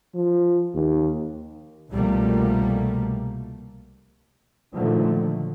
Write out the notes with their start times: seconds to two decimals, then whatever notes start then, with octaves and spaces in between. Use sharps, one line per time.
0.15 F3
0.74 D#2
1.91 C2 B2 F3 G3 A3 A#3
4.73 A#2 D3 D#3 F3 F#3 A3